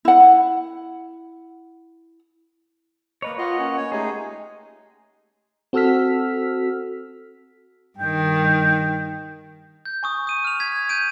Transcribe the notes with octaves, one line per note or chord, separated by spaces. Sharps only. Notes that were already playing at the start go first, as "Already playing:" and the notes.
E4 F#5
A#3 B4 C#5 D#5
F4 D#5 F#5
C#4
C#5
G#3 A3 D#4 G4 G#4
C4 F#4 A4 E6 F6 B6
G2 D#3 G5
G6
G#5 C#6 D#6
D#6 D#7
F6 F7
G#6 B6
G6 G#6 D7 D#7